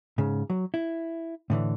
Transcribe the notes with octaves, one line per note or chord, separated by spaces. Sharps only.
G#2 C#3
F#3
E4
A2 D3 E3